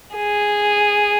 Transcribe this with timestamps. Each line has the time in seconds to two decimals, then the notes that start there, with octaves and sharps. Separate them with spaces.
0.16 G#4